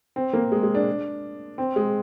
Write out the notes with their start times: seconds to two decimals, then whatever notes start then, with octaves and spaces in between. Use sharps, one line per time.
0.16 C4
0.33 A#3
0.52 G#3
0.63 G#3
0.75 D4
1.58 C4
1.76 G#3